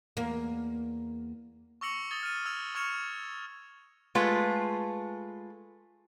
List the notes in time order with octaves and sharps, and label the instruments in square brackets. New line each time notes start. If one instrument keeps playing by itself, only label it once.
[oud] E2 A#3
[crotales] C#6 D6 E6 A#6 C#7 F#7
D#6 G#6 A6 G7
F6 D#7
E6 G#6 F7
C#6 F6 G#6 C#7 E7 F7
[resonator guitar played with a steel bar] G#3 A3 F4 B4